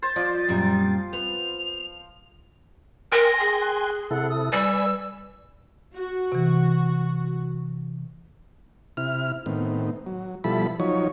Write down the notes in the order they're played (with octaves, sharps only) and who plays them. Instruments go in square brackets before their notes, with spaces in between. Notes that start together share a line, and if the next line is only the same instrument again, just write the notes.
[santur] C5 [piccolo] A6
[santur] F3 [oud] D5
[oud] F#2 A#2 G3
[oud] B3 [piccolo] F7
[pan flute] A#4 [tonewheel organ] G5 G#5 C6 [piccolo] A#6
[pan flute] G#4
[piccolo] F#6
[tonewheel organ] C3 E4 A4 [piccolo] F#5
[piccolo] D#6
[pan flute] G3 [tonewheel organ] B4 D5 G#5 [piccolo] E6
[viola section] F#4
[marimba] C3 E3
[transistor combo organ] C3 E4 F6
A2 D#3 B3 C4
F#3
B2 F3 G3 E4 A4 B5
F3 F#3 D#4 C#5